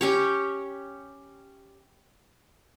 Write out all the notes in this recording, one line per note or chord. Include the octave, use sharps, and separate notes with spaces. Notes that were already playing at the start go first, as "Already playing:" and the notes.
C#4 G4 C#5